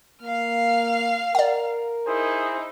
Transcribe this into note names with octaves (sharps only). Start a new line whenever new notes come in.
A#3 F5 F6
A#4 D5 F#5
D#4 E4 G#4 C5